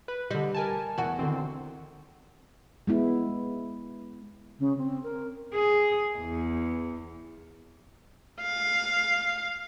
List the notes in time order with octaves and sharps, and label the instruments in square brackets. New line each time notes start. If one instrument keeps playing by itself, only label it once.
[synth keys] B4
[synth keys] D3 D#5 [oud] G3
[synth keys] A#4 G#5 A5
[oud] E2 F#4
[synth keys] D3 D#3 C4
[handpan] G#3 B3 E4
[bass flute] C#3
C4
A#4
[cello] G#4
E2
[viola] F5